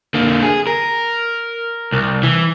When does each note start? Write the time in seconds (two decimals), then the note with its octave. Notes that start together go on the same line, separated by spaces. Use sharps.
0.14 D3 A#3
0.43 G#4
0.67 A#4
1.92 C2
2.23 E3